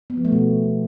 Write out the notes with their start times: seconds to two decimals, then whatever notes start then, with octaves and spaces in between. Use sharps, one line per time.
0.10 B3
0.17 F3
0.25 A3
0.32 B2